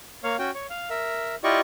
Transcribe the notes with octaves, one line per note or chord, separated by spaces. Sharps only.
A#3 C#5 F5
C#4 F#4 G5
C#5
F5
A#4 E5
E4 F4 G4 D5 D#5 C#6